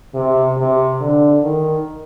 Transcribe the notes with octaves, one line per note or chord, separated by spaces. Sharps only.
C3
C3
D3
D#3